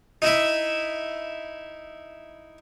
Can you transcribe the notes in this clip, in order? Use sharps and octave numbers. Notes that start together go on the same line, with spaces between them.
D#4 E4 E5